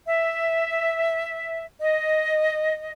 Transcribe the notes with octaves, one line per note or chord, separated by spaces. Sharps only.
E5
D#5